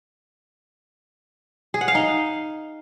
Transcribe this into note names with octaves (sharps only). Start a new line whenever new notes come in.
G#4
F#5
F5
D#4